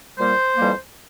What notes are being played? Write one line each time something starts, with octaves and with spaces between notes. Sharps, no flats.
A#2 G3 A#3 C5
F2 E3 G3 A#3